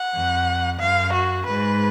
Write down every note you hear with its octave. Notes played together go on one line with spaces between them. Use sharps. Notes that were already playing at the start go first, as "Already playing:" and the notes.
Already playing: F#5
F2
F#2 F5
F#4
G#2 B4